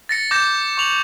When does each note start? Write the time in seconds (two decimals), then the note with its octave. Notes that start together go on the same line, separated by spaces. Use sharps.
0.09 A6 A#6 C#7
0.31 D6 G6 A#6 E7
0.77 C#6 F7 F#7